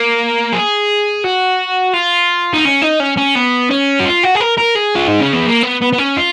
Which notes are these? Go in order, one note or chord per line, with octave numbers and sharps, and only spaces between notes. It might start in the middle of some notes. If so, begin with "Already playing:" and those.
Already playing: A#3
G#4
F#4
F4
D#4
C#4
D#4
C#4
C#4
B3
C#4
F#4
F4
F#4
G#4
A#4
A#4
G#4
F4
D#4
C#4
B3
A#3
B3
B3
B3
C#4
F4